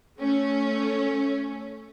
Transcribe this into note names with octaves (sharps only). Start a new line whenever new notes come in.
A3 C#4